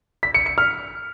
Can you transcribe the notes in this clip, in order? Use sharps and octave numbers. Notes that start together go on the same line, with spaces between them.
B6
C#7
C#7
F6